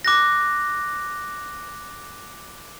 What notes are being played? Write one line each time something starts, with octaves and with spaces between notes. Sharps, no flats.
D6 F#6 A#6